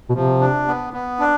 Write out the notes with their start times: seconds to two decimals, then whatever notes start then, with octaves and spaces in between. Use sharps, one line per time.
0.10 B2
0.14 C3 F3
0.41 D4
0.68 B3
0.93 B3
1.20 D4